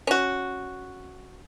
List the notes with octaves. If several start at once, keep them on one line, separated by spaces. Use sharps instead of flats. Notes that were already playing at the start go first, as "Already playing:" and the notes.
C#4 F#4